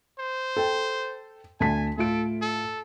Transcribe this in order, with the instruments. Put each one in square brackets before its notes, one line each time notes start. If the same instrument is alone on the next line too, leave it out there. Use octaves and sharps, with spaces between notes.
[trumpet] C5
[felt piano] A4 G5
[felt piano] D2 A5 B6 [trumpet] G#5
[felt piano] A2 F4 D7 [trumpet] A4
[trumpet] A4